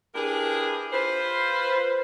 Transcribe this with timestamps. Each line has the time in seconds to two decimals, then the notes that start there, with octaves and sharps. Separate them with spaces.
0.15 D4 E4 G4 G#4 A#4 B4
0.93 F4 B4 C5